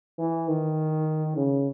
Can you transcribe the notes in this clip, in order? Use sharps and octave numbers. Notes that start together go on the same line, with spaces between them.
E3
D#3
C#3